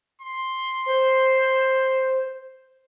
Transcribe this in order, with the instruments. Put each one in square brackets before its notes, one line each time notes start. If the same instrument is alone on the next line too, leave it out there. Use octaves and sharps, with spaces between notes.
[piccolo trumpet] C6
[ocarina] C5